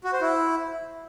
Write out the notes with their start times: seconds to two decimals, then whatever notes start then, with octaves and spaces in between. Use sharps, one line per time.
0.04 F#4
0.13 C5
0.21 E4